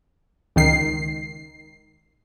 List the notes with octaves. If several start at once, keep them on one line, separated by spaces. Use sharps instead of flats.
C#2 D#3 C7